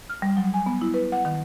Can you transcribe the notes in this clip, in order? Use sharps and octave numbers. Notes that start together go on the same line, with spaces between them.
F6
G3
F#3
G#5
B3
E4
B4
F#5
D#3